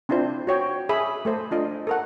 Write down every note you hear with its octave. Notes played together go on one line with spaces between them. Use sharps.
C4 D4 E4 F4 C5
F#4 C#5 G5
G#4 E5 B5
A3 A4 C5
D4 F4 D#5
A4 A#4 F#5